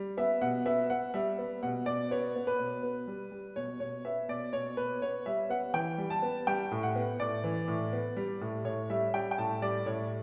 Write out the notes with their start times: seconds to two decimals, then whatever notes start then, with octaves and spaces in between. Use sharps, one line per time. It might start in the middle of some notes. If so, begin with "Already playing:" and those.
Already playing: G3
0.17 B3 E5
0.41 B2 F#5
0.66 B3 E5
0.90 B3 F#5
1.14 G3 E5
1.38 B3
1.63 B2 F#5
1.86 B2 D5
2.11 B3 C#5
2.36 B3
2.47 B4
2.60 B2
2.83 B3
3.07 G3
3.32 G3
3.56 B2 C#5
3.80 B2 C#5
4.05 B3 E5
4.28 B2 D5
4.53 B2 C#5
4.77 B2 B4
5.02 B3 C#5
5.26 G3 E5
5.50 B3 F#5
5.74 E3 G5
5.98 G3
6.10 A5
6.22 B3
6.47 G3 G5
6.71 A2
6.83 F#5
6.95 B3
7.20 A2 D5
7.44 E3
7.68 A2
7.93 B3
8.17 G3
8.41 A2
8.65 A2 C#5
8.90 G3 E5
9.14 G3 G5
9.31 G5
9.38 A2 A5
9.62 G3 D5
9.86 A2 C#5